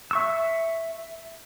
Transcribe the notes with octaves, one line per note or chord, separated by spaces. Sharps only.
E5 C#6 E6